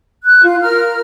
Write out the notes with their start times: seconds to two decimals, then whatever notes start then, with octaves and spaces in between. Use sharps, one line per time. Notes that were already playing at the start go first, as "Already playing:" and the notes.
0.24 F#6
0.42 F4
0.62 A#4 F6